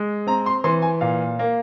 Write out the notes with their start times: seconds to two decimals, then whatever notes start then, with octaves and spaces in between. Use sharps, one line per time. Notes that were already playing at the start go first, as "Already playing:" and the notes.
Already playing: G#3
0.27 C4 A#5
0.46 C6
0.64 E3 C6
0.82 G#5
1.01 A#2 F5
1.39 A#3